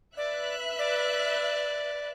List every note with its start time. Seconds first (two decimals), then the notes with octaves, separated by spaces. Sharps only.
0.17 B4 D5 E5 F#6
0.79 D5